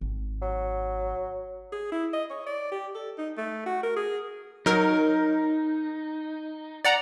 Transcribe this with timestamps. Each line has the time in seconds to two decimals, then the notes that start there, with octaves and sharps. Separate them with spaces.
0.01 G#1
0.42 F#3
1.72 G#4
1.92 E4
2.13 D#5
2.30 C#5
2.47 D5
2.72 G4
2.95 A4
3.18 D#4
3.37 A3
3.66 F#4
3.83 A#4
3.96 G#4
4.66 F#3 D#4 A#4
6.85 D5 F#5 A#5